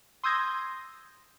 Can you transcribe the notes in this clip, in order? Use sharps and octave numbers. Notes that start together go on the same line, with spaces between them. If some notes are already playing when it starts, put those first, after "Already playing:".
C6 D#6 E6 G6 G#6 A#6